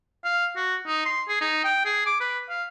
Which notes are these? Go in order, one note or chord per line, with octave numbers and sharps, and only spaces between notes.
F5
F#4
D#4
C6
G#4
D#4
G5
G#4
D6
B4
F5